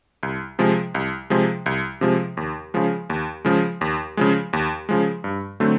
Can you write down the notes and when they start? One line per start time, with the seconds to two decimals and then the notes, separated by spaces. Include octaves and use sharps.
0.23 C2
0.59 C3 F3 G#3
0.95 C2
1.30 C3 F3 G#3
1.66 C2
2.01 C3 F3 G#3
2.37 D#2
2.74 C#3 F3 G#3
3.10 D#2
3.45 C#3 F3 G#3
3.81 D#2
4.17 C#3 F3 G#3
4.53 D#2
4.89 C#3 F3 G#3
5.24 G2
5.60 D3 F#3 A3 C4